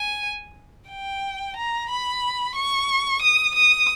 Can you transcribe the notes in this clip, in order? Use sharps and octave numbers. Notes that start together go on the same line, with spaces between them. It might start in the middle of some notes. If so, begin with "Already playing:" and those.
Already playing: G#5
G5
A#5
B5
C#6
D#6
D#6